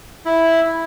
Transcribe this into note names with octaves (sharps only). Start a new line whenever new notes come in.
E4